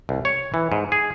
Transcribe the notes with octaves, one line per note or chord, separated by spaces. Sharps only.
C2
C#5
E3
G#2
G#4